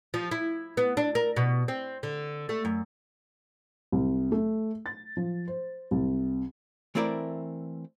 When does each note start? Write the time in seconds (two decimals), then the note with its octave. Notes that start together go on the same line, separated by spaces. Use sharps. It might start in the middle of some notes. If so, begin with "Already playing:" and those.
0.14 F3
0.31 E4
0.77 B3
0.97 D4
1.15 A#4
1.36 B2
1.68 C4
2.03 D3
2.49 A3
2.65 F#2
3.92 C2
4.32 A3
4.86 A6
5.17 F3
5.48 C5
5.91 C2
6.95 E3 A3 C4 E4 A#4 D5